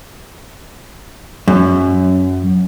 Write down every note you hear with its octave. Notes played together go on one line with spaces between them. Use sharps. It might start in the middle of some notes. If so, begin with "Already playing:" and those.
F#2